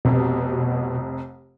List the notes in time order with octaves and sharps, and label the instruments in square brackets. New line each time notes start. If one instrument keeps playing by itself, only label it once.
[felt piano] F1 C2 F2 [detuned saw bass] B2